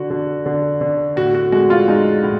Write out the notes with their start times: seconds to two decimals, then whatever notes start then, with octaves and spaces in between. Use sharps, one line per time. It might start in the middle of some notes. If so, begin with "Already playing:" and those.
Already playing: D3 F#4
0.10 D3
0.46 D3
0.81 D3
1.16 A2 F#4
1.35 F#4
1.52 G#3 F#4
1.70 F4
1.88 G#3 D#4
2.23 A2